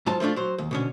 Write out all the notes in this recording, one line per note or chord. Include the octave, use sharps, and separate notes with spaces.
G#2 F#3 F4 A5
F3 A3 C4 D4 F4
F#3 C5
D#2
B2 D3 C#4